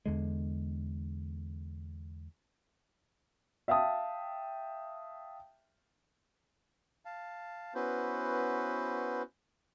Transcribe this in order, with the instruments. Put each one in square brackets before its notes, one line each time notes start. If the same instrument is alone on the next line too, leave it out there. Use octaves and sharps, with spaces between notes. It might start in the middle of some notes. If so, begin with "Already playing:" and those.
[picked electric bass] E2 D3 G#3
[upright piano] E5 F5 G5 A5 D#6
[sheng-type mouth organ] F5 A5
B3 C#4 E4 F#4 B4 C5